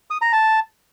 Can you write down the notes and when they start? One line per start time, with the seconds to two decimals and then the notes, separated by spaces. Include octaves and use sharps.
0.10 D#6
0.22 A#5
0.33 A5